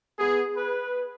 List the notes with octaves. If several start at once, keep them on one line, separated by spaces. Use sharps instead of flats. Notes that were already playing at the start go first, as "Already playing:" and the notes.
B3 G#4
B4